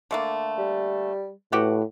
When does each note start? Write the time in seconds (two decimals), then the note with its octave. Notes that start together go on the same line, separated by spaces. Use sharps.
0.11 D3 A3 A#3
0.58 G3
1.52 A2 E3 F#4 G4 F#5